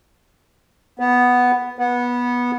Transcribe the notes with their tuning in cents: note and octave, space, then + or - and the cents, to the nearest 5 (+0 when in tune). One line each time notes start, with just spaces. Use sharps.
B3 +0
B3 -15